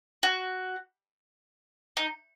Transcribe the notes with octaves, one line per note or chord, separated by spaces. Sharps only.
F#4
D#4